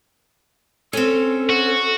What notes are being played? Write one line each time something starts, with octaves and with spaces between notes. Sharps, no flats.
C4 C#4 A4
F#4